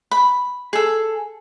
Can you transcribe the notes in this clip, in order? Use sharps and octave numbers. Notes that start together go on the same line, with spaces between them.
B5
G#4 A4